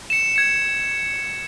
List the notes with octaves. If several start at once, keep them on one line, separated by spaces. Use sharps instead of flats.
C#7 E7
G#6 C#7 E7